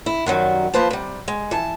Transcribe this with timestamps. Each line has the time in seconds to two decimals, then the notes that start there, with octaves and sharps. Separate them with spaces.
0.06 E4
0.26 F#2 D#3 F#3 G3
0.73 F3 A#3 B4 C5 A5
0.91 C3 G3
1.28 G#3
1.51 E3 A5